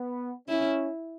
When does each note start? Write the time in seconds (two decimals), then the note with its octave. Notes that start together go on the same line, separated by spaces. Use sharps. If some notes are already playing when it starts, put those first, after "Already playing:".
Already playing: B3
0.49 C#4 E4